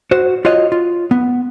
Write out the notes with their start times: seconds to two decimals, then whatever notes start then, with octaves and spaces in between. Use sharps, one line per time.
0.11 F#4 C5
0.45 F4 F#4 C#5 D#5
0.72 F4
1.11 B3